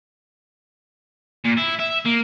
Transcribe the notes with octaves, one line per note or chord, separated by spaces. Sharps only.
A#2
E4
E5
A#3